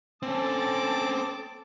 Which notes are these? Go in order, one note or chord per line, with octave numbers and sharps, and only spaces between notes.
C4 C#4 A4 A5 D6